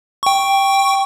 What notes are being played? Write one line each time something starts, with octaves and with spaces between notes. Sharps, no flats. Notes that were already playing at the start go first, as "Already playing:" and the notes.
G5 C#6